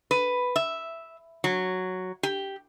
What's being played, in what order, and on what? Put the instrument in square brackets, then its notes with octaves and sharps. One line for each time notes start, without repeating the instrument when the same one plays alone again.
[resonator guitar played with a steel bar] B4
E5
F#3
G4